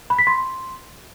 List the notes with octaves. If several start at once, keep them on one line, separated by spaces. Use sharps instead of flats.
B5
B6
C6